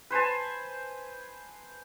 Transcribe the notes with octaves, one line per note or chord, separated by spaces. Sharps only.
B4 C5 G#5 A5